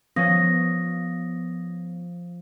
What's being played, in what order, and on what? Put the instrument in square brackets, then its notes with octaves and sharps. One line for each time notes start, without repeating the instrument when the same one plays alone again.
[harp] F3 C#4 [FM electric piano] B3 [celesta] D#6 A#6